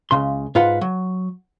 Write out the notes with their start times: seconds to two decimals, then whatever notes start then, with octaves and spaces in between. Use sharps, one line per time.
0.11 C#2 C#3 C6
0.55 G#2 F4 B4 F#5
0.81 F#3